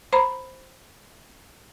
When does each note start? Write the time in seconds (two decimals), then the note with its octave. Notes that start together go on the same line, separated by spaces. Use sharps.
0.13 C5 A#5 B5